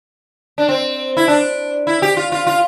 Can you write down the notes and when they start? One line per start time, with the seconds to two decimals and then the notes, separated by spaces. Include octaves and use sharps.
0.58 D4
0.69 C4
1.17 E4
1.28 D4
1.87 E4
2.02 G4
2.17 F4
2.32 F4
2.47 F4